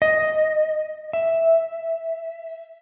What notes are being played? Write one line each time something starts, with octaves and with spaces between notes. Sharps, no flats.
D#5
E5